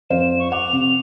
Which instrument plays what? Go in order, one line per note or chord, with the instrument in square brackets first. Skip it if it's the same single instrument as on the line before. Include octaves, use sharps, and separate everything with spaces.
[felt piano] F2 C5 F5 [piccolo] E7
[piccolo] C#6
[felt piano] F#5 D6 [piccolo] F7
[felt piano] C3